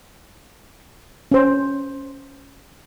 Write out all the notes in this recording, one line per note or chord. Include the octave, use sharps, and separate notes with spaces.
C#4 C5